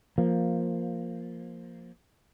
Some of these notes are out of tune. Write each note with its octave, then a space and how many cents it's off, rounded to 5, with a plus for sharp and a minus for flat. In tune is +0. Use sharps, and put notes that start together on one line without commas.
F3 +0 A#3 +0